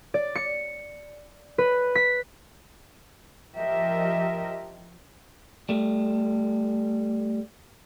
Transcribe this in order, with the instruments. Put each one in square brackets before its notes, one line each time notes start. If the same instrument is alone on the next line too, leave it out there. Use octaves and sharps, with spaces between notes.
[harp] D5
C#7
B4
B6
[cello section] F3 G4 A#4 D#5 E5
[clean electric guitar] G3 A3